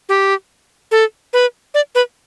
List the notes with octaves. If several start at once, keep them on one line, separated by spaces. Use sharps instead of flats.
G4
A4
B4
D5
B4